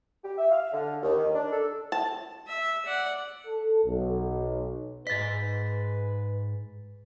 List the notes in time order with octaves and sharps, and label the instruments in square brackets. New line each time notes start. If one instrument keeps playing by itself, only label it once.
[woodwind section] G4
E5
F5
D3
D#2
D#3
D4
A4
[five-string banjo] A5
[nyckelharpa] E5
D5 F#5
[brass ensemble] A4
B1
[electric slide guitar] G#2 D#5 [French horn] B4 [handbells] A6 B6